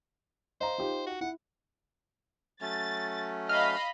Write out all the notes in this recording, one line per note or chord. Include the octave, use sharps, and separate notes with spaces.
C5 D#5 F5 A#5
D#4 F4 G4
F#4
E4 F#5
F#3 A3 C#4 A6
D#5 F5 B5 F6